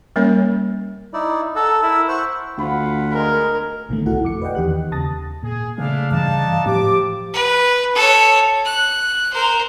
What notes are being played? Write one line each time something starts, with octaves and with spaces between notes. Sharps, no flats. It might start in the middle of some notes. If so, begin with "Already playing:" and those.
G3 A#3 C#4 A#4 C#5
D#4 E4 D5
A4 F#5 A#5 E6
E4 A#4
C5 F#5 C#6
D2 F4 F#5 B5
G#3 A#4
A1 B2 D3 D#3 A3
C2 A3 E4 F#4 A4 F#5
F2 D6 C#7
B4 D5 D#5 F#5 G5
E2 D#3 G4 F#6
D#2 C#3 A5 D#6 A6 A#6
A#2 G#4
C#3 A3 D4 E4 F5
G2 E3 D4 D#4 F5 A5
A2 F3 G4 D6
B4
A4 C#5
F#6
A#4 C5